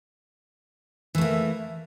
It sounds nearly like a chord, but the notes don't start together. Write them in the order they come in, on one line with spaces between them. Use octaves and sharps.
E3 A3 A#3